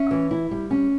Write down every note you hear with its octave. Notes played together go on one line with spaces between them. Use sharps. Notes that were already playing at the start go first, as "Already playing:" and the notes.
Already playing: C#4 E5
E3
E4
G3
C#4